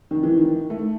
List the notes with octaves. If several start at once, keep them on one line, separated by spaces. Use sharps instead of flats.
D#3
E3
D#3
A3